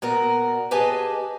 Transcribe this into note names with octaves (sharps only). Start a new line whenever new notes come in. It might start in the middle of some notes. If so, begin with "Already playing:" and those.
A#2 B3 F#4 A#4
G4 G#4 B4 D#5 G#5 A5